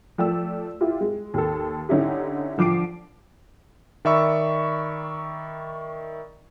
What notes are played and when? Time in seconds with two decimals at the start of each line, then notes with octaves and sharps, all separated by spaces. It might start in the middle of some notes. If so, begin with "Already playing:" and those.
0.18 F3 A3 D5 G5 E6
0.81 E4 F4 G4
1.01 G#3
1.34 D#2 A4
1.89 D3 C#4 D#4 E4 G4
2.58 D3 F3 D6 C7 D7
4.05 D#3 D5 E5 B5 C#6 E6